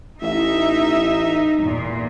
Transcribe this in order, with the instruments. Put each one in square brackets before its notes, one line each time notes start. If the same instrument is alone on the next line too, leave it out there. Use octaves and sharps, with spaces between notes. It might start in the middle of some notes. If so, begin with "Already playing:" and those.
[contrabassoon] A1 [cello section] D#4 [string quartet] E5
[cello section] E2 A#2